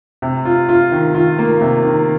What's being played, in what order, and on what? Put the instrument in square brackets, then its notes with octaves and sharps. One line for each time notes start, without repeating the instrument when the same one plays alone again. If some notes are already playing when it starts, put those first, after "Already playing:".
[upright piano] C3
F4
F4
D#3
F4
A#3
C3
D#3